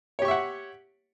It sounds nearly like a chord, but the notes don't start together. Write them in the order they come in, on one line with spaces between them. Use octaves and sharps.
C#5 G4 C#6 E5 F#5